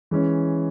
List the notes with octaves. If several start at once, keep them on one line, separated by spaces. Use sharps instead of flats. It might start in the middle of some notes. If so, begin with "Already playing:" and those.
E3 G#3 C#4